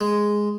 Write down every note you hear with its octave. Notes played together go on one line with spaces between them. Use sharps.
G#3